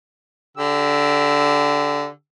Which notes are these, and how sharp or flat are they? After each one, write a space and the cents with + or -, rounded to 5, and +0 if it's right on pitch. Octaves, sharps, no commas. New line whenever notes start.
D3 -15 G4 +0 E6 +0